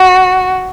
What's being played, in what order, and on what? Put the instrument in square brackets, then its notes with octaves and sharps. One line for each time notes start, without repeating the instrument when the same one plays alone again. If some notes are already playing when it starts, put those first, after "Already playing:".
Already playing: [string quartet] F#4